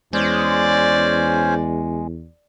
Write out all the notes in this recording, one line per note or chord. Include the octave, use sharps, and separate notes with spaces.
E2 G#3 C#4 C5 D5 G#5